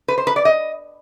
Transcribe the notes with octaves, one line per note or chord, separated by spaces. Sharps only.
B4
C5
B4
D5
D#5